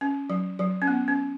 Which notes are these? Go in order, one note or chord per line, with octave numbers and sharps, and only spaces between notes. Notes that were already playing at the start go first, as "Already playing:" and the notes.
C#4
F#3
F#3
C#4
B3
C#4